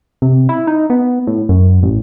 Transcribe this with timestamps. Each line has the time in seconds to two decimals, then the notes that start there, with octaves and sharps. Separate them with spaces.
0.22 C3
0.49 E4
0.67 D#4
0.90 B3
1.27 A2
1.49 F#2
1.83 A1